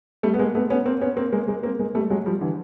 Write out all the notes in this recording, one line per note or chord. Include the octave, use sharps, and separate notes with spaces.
G3 A3
B3
G#3 A#3
A3 B3
B3 C#4
A#3 C4
B3 C#4
A#3 C4
G#3 A#3
G#3 A#3
A#3 C4
G#3 A#3
G3 A3
F#3 G#3
F3 G3
D3 E3